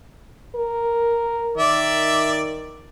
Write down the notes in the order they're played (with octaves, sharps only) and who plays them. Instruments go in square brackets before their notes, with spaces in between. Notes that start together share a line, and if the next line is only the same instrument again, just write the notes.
[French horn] A#4
[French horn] D#3 [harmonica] D5 E5